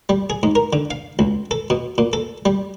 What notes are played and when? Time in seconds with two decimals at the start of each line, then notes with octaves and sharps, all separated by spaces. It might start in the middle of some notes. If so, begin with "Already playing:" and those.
0.09 G3
0.30 G#4
0.43 G#2
0.55 A#4
0.73 D3
0.91 F5
1.19 C#2
1.51 A4
1.70 B2
1.98 A#2
2.13 A4
2.45 G3